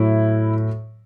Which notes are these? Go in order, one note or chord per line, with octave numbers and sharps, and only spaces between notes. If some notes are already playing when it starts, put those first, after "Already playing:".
Already playing: A2 F#3 E4